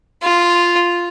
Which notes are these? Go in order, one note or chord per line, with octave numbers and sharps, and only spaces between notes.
F4